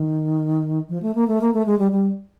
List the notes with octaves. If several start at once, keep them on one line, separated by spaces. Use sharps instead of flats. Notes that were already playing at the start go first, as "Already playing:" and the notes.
Already playing: D#3
F3
A3
A#3
A3
A#3
A3
G#3
G3
G3